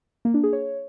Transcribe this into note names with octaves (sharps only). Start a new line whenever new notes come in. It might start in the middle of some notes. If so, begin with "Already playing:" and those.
A#3
D4
G#4
C#5